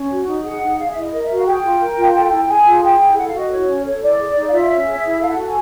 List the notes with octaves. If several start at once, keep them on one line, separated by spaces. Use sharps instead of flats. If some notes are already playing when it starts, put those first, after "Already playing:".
Already playing: C#4
F#4
D#4
G#4 F#5
D#4
G#4 F5
E5
E4
D#5
A#4 D#5
E5
F#4
F5
G#4 G5
F4
A#4
F4
A4
E4
G#4 G#5
F4
G#4 G5
E4
A4 F#5
F5
F#4
D#5
E4 C#5
C#4
A4 C#5
E4 D5
G#4
D#4
F5
F4 E5
C#4
G#4
E4
A4 F5
F#5
F#4
G#5